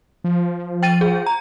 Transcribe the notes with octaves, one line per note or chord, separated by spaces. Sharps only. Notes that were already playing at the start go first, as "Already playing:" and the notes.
F3
G5 A6 D#7
G#4
A#5